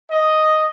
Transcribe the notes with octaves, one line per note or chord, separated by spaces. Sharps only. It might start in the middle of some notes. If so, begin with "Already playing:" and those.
D#5